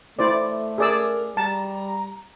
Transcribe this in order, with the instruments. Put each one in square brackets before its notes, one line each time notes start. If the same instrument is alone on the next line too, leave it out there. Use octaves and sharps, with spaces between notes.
[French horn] A3 [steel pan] E4 C5 D5
[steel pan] G#4 D5 E6 [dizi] A#4
[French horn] G3 [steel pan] A5 [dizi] A#5